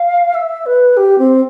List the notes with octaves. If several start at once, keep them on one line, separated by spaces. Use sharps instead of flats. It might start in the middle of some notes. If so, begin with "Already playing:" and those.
Already playing: F5
E5
B4
G4
C4